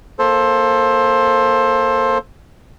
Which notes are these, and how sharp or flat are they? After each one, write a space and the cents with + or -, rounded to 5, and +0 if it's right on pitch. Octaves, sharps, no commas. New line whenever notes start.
A#3 +0 A4 +0 C5 +20